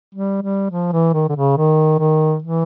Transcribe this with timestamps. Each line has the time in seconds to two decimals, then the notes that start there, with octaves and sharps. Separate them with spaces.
0.15 G3
0.42 G3
0.71 F3
0.92 E3
1.14 D#3
1.29 D3
1.35 C#3
1.57 D#3
1.99 D#3
2.42 E3